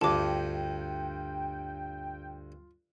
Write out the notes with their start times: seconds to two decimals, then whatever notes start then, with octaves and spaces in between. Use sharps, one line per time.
0.01 D2 G2 F4 G5 A5 D6